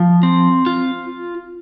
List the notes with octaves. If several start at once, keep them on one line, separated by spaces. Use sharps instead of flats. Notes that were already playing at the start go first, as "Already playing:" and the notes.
Already playing: F3
C4
F4